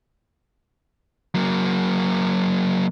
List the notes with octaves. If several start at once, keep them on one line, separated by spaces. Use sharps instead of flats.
F#3 A#3